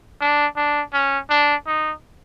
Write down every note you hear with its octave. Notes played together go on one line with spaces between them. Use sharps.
D4
D4
C#4
D4
D#4